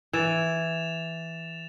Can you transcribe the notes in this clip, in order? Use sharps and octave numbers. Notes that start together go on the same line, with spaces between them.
E3 A6 E7 F7